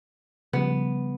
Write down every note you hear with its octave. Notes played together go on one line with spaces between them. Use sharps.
C#3 F3 G3 B3